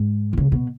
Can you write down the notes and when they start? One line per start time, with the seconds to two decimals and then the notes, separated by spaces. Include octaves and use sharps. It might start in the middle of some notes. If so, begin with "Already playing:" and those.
Already playing: G#2
0.33 D#3
0.37 C#3
0.52 B2